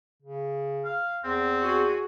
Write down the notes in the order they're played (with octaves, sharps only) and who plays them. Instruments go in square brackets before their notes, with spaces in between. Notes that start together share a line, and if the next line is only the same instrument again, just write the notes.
[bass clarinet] C#3
[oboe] F5
[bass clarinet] E2 [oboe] C4
[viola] F#4 G#4